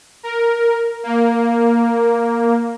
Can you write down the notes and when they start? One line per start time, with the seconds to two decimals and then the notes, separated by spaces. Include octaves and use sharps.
0.23 A#4
1.03 A#3